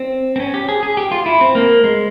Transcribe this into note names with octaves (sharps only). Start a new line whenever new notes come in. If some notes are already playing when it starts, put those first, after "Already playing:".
Already playing: C4
C4
C#4
G4
G#4
G#4
G4
F4
E4
C4
A#3
G#3